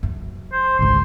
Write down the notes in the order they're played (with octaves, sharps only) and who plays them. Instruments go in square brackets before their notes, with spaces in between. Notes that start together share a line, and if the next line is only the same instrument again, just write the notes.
[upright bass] F#2
[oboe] C5
[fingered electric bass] G#1 C#2 [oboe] C6